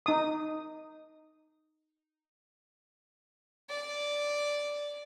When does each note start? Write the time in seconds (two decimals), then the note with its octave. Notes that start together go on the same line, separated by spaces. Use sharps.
0.06 D#4 D#6
3.70 D5